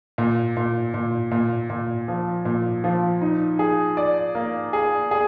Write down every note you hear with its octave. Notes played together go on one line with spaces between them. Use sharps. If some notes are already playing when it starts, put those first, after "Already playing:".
A#2
A#2
A#2
A#2
A#2
F3
A#2
F3
D#4
G#4
D5
A#3
G#4
G#4